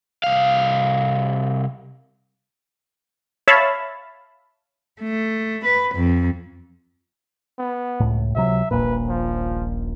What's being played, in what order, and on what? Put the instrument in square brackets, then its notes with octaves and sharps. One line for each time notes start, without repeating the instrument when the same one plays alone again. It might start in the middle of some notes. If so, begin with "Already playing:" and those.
[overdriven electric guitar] C2 F5
[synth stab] C#5 E5 F5 A5 B5
[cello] A3
B4
F2
[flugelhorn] B3
[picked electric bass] C#2 A2
[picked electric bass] C#2 C3 F#3 [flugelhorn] E5
[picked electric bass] D#1 A#1 A#2 [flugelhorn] B4
[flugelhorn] F3